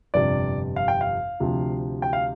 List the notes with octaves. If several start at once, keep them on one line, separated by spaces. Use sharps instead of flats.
G1 F2 C3 D5
F5
G5
F5
D2 C3 F3
G5
F5